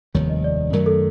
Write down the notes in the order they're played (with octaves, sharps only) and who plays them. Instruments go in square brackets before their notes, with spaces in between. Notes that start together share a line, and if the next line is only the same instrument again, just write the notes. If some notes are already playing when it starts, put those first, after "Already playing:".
[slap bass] F1 D#2 D#3 G3 [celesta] C#5
[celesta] D#5
D5
[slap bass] F#2 D#3 F#3 A3 [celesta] A#4
[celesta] A4